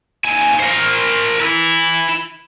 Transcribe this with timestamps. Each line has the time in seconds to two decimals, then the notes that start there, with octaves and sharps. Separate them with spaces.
0.25 D#2 G#5
0.60 A#4 C5
1.40 E4 B4